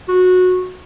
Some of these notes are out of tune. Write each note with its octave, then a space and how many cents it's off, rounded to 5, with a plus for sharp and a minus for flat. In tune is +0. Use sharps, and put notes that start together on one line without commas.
F#4 -15